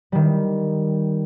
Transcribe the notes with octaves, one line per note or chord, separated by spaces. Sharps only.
D#3 G3